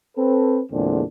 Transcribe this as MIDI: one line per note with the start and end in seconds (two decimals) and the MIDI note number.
0.17 0.62 60
0.17 0.62 69
0.17 0.62 71
0.72 1.03 40
0.72 1.03 46
0.72 1.03 50
0.72 1.03 56
0.72 1.03 60
0.72 1.03 62